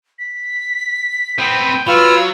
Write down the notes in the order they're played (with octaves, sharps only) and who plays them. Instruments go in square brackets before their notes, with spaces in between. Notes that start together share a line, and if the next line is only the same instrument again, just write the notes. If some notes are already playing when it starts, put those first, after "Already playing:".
[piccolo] B6
[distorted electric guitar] B3 C4 [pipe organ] G5
[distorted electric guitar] F#3 [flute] F4 [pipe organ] B4 E6 F6